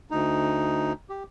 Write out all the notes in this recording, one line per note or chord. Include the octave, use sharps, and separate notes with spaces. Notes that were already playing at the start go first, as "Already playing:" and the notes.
D2 D#4
G4